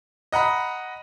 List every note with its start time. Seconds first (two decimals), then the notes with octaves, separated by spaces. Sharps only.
0.32 D#5 F#5 A#5 B5